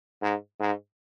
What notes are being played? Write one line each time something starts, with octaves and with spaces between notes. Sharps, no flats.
G#2
G#2